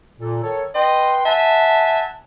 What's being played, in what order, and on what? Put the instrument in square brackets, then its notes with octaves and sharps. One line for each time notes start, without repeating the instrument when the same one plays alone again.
[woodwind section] A#2 A4
D#3 A4 C#5
[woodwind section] B4 G5 C6 [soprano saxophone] D#5
[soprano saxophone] E5 [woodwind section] F#5 G#5 A5